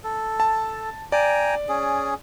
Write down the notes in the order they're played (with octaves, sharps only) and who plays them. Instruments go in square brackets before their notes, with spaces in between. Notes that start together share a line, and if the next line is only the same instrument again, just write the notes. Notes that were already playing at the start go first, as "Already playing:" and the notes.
[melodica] A4
[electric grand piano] A5
[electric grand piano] D5 [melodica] G5 G#5 A#5
[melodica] C#4 G#4